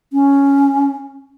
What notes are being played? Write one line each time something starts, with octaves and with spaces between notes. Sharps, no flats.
C#4